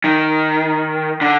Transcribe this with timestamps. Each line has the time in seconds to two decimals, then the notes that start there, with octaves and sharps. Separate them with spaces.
0.04 D#3
1.21 D3